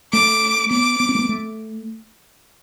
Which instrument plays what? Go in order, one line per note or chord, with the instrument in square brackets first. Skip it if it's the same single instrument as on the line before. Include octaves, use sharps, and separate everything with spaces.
[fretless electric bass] A3 [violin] D6
[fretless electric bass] B3 [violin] D6
[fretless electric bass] B3
C4
A3
B3
A3